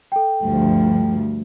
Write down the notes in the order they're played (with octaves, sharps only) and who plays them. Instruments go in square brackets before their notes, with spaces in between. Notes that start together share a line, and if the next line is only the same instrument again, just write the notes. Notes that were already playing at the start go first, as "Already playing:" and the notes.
[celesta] A4 G5
[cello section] D2 G2 F3